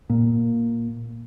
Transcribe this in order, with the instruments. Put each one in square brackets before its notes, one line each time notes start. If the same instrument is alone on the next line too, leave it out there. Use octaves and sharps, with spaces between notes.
[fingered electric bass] A#2